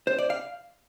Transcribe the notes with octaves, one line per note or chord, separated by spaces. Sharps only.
C5
D5
F5